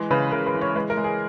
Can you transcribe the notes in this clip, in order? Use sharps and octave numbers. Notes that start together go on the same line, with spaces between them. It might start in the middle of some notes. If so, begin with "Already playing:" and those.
Already playing: E3 G#3
C#3 B4
C#3 A#4
B4
E3
C#5
G#3 B4
A#4
G#3
G#4